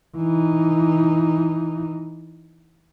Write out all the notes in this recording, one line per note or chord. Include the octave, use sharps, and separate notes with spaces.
E3 D#4